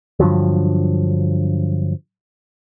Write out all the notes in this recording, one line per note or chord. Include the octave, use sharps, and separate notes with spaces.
G2 D3 F3 F#3